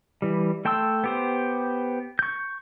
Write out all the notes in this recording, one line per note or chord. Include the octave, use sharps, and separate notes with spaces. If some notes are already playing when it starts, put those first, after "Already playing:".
E3 G3
A3 G5 A5 C6 E6
B3 G4 C5
C#6 G6